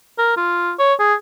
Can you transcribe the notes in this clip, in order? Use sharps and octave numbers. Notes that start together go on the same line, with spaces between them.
A#4
F4
C#5
G#4